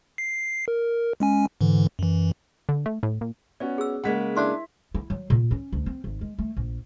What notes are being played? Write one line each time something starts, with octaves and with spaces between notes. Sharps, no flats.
C7
A#4
G#3 C#4 G#5
G#2 D3 E3
F#2 E3
D3
A3
A2
A#2
B3 C#4 F#4 D5
G#4 E6
C#3 G#3 A#3 F#5 B6
D4 E4 C6
E4
F#3
A#2
C#4
D2
C4
G#1
G#3
A3
A#1